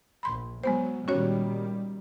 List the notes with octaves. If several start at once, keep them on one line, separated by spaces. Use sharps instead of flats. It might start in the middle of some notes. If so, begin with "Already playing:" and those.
A#1 B5 C6
F#3 G#3 B3 C5
A#2 D#3 G3 C#4 F#4 C#5